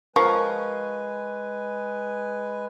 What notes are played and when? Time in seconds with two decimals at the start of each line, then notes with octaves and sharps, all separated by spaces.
0.16 F3 G#3 A#4 B4 G#5 C#6